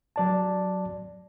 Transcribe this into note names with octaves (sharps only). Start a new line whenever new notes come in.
F#3 D5 A5